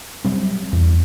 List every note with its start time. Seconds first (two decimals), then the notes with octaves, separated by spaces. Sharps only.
0.25 F#3 G3 C4
0.72 E2